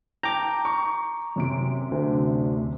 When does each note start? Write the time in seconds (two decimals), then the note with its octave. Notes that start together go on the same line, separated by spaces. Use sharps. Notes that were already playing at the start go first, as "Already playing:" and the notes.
0.23 G5 A5 A#5 D6 G6
0.65 C#6
1.36 F#2 C3 D7
1.91 D2